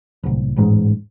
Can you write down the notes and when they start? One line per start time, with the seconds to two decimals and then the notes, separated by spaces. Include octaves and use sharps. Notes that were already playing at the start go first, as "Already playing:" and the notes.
0.23 D1 C2
0.56 E1 A1 G#2